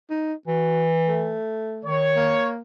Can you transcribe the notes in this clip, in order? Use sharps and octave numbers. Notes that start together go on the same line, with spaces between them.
D#4
E3 F#4
A3
D#3 C#5
A#3